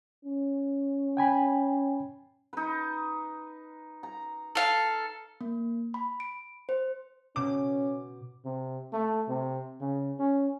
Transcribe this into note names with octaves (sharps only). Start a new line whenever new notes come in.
C#4
G5 G#5 B5
D#4 B4
A#5
A4 F5
A#3
B5
D7
C5
B2 C#4 D6
C3
A3
C3
C#3
C#4